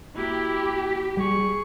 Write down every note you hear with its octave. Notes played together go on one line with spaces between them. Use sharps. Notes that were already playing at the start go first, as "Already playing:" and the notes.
A#3 E4 F#4 G4
G3 G#4 C#6